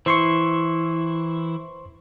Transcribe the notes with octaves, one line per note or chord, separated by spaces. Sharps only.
E3 E4 C5 C6 C#6